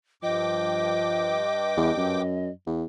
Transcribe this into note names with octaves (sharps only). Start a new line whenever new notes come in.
G2 F3 D#5 G5 D6
E2
F#2
E2